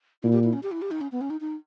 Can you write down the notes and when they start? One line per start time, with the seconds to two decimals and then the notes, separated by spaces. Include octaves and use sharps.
0.23 A#2 E4
0.33 G4
0.44 E4
0.53 C#4
0.63 G4
0.72 E4
0.82 G4
0.91 D#4
1.01 C#4
1.12 B3
1.21 C#4
1.30 D#4
1.41 D#4